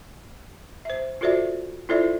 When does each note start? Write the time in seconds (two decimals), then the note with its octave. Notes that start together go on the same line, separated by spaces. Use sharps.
0.85 C5 E5
1.21 F4 F#4 A4 C5 D5 E5
1.89 E4 F4 A4 C5 D5 E5